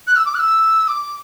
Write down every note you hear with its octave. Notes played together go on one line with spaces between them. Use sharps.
F#6
E6
D6
F#6
E6
D6